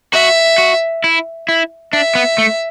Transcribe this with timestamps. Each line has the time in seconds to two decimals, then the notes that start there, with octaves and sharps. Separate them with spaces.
0.13 F#4 E5
0.58 F#4
1.04 E4
1.49 E4
1.93 D4 E5
2.15 B3
2.38 A3